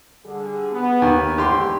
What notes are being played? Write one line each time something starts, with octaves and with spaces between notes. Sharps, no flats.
D3 G3 G#4
B3
D#2
G#2 D3 E3 G4 C6